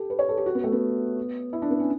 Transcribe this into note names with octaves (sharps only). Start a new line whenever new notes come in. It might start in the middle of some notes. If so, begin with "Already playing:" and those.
Already playing: G4 A4
B4
C#5
A4
G4
F#4
B3
A3
B3
E4
D4
B3
C#4